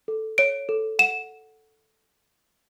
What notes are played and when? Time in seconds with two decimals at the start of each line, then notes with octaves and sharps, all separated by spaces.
0.08 A4
0.38 C#5 D7
0.69 A4
0.99 F#5 E7